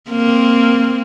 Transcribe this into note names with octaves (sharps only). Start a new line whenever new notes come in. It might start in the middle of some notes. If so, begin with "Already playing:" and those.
A#3 C4